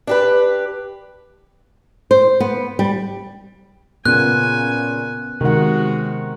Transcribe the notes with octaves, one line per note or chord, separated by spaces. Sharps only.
D4 G4 B4
C5
B3
G3
A#2 C#3 B3 G#5 F#6
C3 D#3 G#3 F#4 F#5